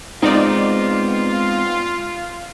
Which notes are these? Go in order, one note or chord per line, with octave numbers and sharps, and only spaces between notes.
G#3 B3 C4 D#4 F4 D5